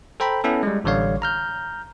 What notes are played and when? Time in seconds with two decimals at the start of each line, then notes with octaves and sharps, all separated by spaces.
0.20 A4 C5 G5 A#5 B5
0.44 B3 C#4 E4 A4
0.63 G3 G#3
0.84 A1 D3 G3 C#5 F5
1.22 A#5 F6 G6